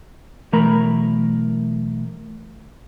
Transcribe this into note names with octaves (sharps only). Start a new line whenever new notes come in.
B1 E3 A3 A#4 A#5 B5